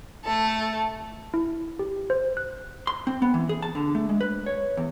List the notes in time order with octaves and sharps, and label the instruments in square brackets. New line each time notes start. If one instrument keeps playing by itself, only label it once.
[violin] A3 A4
[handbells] E4
G4
C5
F#6
[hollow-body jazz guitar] C6
C4
B3
E3
G#4
A5
D3
A3
G#3
B4
C#5
E2